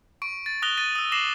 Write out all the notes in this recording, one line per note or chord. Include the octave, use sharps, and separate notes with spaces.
C#6 D7
A6
D#6 F#6 A#6 F7 G7
A6 D#7
D#6 E6
D6 A#6 C7 E7 F#7